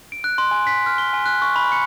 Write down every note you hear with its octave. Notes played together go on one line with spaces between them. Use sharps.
D7
F#6
C6
G#5
B6
F6
G7
G#5
F#6
C#6
B5
C#7